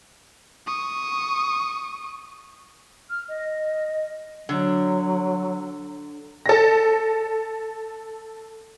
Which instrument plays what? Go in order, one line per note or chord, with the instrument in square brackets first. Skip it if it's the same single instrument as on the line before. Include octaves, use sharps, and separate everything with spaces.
[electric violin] C#6 D#6
[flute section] F6
D#5
[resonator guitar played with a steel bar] D3 [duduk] F#3
[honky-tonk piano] A4 A#6